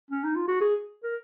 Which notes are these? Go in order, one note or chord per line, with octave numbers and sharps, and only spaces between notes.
C#4
D#4
F4
F#4
G#4
A#4